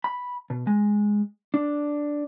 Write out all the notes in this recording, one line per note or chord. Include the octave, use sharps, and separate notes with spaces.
B5
B2
G#3
D4